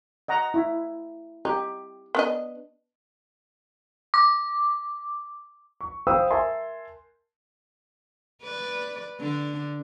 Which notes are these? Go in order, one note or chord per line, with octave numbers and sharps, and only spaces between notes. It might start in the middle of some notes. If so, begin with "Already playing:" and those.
D#5 F#5 A#5
E4
D#4 G4
B3 D4 D#5
D6
C#6
C5 F5 G5 B5 D#6 E6
A#4 E5 G#5 A5 C6
B4 D5
D3 D4